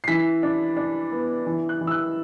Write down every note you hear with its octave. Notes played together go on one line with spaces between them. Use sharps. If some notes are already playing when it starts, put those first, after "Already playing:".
C7
E3 B6
D4
D4
B3
E3
F#6
E3
E6
F#6